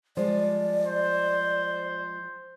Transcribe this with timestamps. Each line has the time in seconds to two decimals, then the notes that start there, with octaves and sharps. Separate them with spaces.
0.17 F3 G3 G#3 D5
0.86 C5